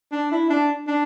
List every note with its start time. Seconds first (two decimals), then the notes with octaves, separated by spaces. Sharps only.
0.12 D4
0.32 E4
0.50 D4
0.88 D4